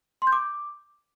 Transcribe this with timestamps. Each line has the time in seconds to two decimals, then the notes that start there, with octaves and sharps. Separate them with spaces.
0.22 C6
0.27 G6
0.32 D6